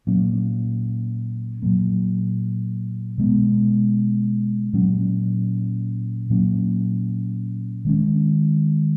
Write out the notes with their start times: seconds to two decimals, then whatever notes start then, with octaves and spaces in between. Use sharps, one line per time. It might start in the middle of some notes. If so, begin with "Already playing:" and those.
0.07 A#2 F#3 A#3 C#4
1.62 A#2 F#3 A#3
3.18 B2 G#3 B3
4.73 A#2 F#3 C#4
6.30 A#2 F#3 A#3 C#4
7.85 D#3 G#3 C#4